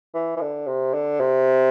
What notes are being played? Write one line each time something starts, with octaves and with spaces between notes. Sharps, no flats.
E3
E3
D3
C3
D3
C3